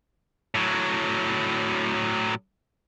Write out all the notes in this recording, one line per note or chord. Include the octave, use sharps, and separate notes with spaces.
A2 F#3